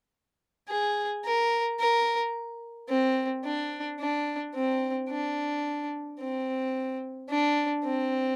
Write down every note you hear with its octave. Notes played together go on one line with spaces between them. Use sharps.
G#4
A#4
A#4
C4
D4
D4
C4
D4
C4
D4
C4